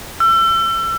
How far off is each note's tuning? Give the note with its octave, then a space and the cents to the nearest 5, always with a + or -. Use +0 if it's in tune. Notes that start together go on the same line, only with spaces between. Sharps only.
E6 +35